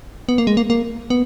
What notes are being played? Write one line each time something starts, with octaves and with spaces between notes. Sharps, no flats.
B3
A#3
G#3
A#3
A#3
B3